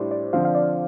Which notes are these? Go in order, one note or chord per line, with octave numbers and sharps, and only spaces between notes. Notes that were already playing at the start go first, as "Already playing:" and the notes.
Already playing: A2 G3 D4 C5 D5
D5
D3 F3 C4 F5
F5
D5